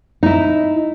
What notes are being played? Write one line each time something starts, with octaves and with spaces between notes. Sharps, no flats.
D#4 E4